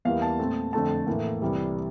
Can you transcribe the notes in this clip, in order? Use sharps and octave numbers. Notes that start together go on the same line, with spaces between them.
E2 E3 G3 A#3 F5
A5
A#2 A3 C4
F2 D3 A3 C4 A5
A2 E3 A#3
C2 C3 E3 G3